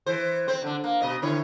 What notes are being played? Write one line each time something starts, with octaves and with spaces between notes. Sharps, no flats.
E3 C5
C4 C5
D3 D4
A#3
B2 D#5
D3 E4 C#5